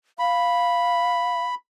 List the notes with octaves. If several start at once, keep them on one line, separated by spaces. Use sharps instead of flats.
F5 B5